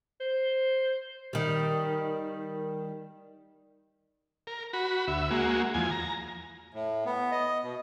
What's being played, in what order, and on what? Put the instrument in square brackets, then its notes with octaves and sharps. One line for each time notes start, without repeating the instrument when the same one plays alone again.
[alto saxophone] C5
[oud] D#3 G3
[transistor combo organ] A#4
F#4 B5
D2 E5
G#3 A#3 F#4
E2 F3 G#5
A#5
[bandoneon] A2
B3
D#5
B2